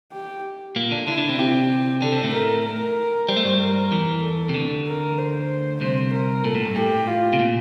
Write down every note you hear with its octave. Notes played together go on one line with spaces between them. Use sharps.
G4
A#2 A#3
D3 D4
D3 D4 E4
D3 D4
C3 C4
C3 C4 G4
D3 D4 A4
C3 C4
A2 A3
A#4
A#4
G3 C5
A3
G2 G3
A#4
E2 E3
A4
C3
D2 D3
A#4
C5
C2 C3 C5
A#4
A#2 A4
A2
G2
A2 G4
F4
C3
A#2